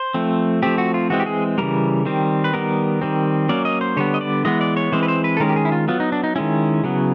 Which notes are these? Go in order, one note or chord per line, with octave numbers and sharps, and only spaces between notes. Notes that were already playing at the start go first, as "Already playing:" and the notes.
Already playing: C5
F3 A3 C4
F3 A3 C4 G4
F#4
F4
E3 G#3 C4 F#4
G4
G#4
C#3 E3 G3 A#4
D#3 G3 C4
B4
D#3 G3 B3 A#4
D#3 G3 C4
F#3 A#3 C#4 D5
D#5
C5
D3 G3 B3 C#5
D#5
D5
E3 G#3 B3 D#5
D5
C#5
E3 G#3 C4 C5
B4
C5
B4
A4
D#3 G#3 C#4 A#4
G4
G#4
E4
F4
F#3 B3 F4
D#4
D4
D#4
D#3 G#3 C#4 E4
C#3 F#3 B3